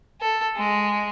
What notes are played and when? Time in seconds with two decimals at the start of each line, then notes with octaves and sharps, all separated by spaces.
0.21 A4
0.56 G#3